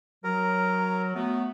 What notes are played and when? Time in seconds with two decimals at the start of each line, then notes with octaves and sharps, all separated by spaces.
0.24 F#3 A#4
1.14 F#3 A3 B3